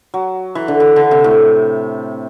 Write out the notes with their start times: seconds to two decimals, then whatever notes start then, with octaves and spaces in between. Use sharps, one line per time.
0.14 F#3
0.55 E3
0.68 D3
0.80 E3
0.96 D3
1.11 C3
1.24 A2